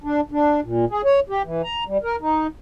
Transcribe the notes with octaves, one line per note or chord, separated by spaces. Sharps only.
D4
D4
A#2
G#4
C#5
G4
E3
A#5
G3
A#4
D#4